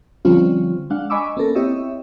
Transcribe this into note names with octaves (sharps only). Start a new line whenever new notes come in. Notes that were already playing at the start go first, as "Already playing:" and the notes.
D3 F3 G3 C4 C#4 F4
G#3 D4 F5 F#5
D#5 G#5 B5 C#6 D6 E6
A#3 B3 C#4 A4 A#4
C4 E4 G4 C#5 D#5 E5